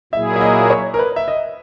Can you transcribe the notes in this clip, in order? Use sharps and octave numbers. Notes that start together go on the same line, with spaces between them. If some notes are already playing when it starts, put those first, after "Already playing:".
A#2 F#3 A#3 E4 G#4 E5
E5
D#5
C#5
A#4
B4
E5
D#5